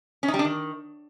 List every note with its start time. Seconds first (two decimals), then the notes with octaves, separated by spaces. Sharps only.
0.23 C#4
0.28 D#4
0.34 G3
0.39 D4
0.44 D#3